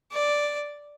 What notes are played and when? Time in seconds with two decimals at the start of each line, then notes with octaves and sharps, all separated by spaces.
0.12 D5